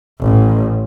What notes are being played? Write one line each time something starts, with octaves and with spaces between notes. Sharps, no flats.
A1